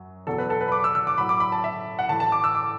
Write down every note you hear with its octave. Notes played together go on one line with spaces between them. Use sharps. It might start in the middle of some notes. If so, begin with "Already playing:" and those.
Already playing: F#2 F#3
E2 B2 F#3 A4
B4
A4
B4
B5
D6
E6
E6
D6
A2 F#3 B5
D6
B5
A5
E5
F#5
A2 E3 A5
A5
D6
E6
D6